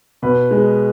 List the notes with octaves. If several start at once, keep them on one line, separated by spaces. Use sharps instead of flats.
B2 B4
G#3